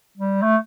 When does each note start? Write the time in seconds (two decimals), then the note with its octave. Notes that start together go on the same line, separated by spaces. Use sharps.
0.17 G3
0.42 A3